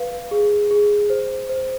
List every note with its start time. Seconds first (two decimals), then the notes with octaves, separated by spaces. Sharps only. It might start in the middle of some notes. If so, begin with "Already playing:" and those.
Already playing: B4 F5
0.31 G#4
0.71 G#4
1.10 C5
1.49 C5